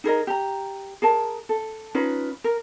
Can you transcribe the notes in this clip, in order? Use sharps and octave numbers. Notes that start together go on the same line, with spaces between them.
D#4 G#4 A#4 D#5
G4 A#5
G#4 A#4 A5
A4
C#4 D#4 F4 B4
A#4